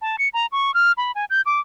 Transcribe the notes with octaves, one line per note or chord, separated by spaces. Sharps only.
A5
C#7
A#5
C#6
F6
B5
G#5
G6
D6